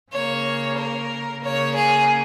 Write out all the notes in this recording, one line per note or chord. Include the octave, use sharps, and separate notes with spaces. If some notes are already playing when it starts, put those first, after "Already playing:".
C#3 A#3 C#5
A#4
C#3 A#3 C#5
G#4